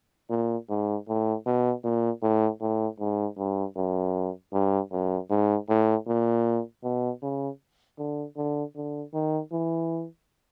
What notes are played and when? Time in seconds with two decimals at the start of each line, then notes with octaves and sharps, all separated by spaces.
0.30 A#2
0.70 G#2
1.08 A2
1.46 B2
1.84 A#2
2.22 A2
2.61 A2
3.00 G#2
3.38 G2
3.76 F#2
4.53 G2
4.92 F#2
5.30 G#2
5.69 A2
6.07 A#2
6.84 B2
7.22 C#3
7.98 D3
8.37 D3
8.76 D3
9.14 D#3
9.52 E3